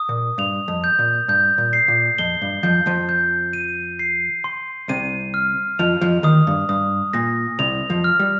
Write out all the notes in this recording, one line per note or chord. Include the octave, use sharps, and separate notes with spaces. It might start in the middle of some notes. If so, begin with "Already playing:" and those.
Already playing: D#6
A#2
G2 F7
F2
G6
A#2
G2 G6
A#2
C7
A#2
F2 G7
G2
F2 F3 G6
F2 F3
G6
D#7
C7
C6
C2 C3 D#7
F6
F2 F3 F7
F2 F3
D#2 D#3 D#6
G2
G2 D#6
A#2 A#6
C2 C3 F7
F2 F3
F6
G3